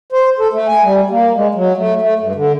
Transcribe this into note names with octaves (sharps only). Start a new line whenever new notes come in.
C5
A4
A3
G#5
G3
A#3
G#3
F#3
A3
A3
G2
D3